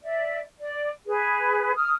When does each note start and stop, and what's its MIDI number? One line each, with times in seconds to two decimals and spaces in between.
0.04 0.39 74
0.04 0.39 76
0.59 0.90 74
1.07 1.74 68
1.07 1.74 71
1.74 1.93 87
1.74 1.93 89